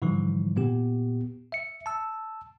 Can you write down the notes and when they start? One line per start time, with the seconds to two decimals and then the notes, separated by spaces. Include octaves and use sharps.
0.02 G#2 D3 E3 F3 G3 D#4
0.56 A#2 B3 G4
1.52 E5 C#7
1.86 A5 E6